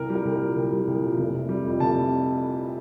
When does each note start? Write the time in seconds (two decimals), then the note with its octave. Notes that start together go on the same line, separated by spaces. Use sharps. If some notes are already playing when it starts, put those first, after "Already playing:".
Already playing: C2 A#4
0.10 G3
0.15 A#4
0.25 C2
0.36 A#2 A#4
0.56 C2
0.71 G3
0.87 C2
1.03 A#2
1.18 F1
1.34 C3
1.49 G3
1.65 F2
1.80 F1 A5
1.95 C3